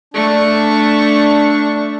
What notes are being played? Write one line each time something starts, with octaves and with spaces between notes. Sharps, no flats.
A3 D4 C#6